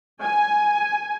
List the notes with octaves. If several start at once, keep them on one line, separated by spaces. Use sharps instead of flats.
G#5